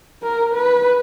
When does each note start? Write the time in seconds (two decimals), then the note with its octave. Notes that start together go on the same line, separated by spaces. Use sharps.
0.22 A#4
0.54 B4